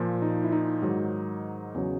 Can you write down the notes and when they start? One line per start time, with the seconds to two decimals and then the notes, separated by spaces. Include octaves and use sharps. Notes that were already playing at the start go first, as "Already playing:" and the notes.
Already playing: A#2 F3
0.22 D#4
0.44 E4
0.52 D#4
0.82 G#2 D#3 F#3
1.74 E2 C#3 F#3